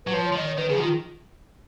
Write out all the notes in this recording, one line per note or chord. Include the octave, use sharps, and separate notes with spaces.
F#3 B4
F3 C#5
C#5
F3
D#3 D#5
C#5
D#3 B4
C#3 G#4
F3
D#3 F4